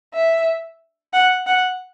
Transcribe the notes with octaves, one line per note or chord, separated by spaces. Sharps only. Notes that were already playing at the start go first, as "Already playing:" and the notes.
E5
F#5
F#5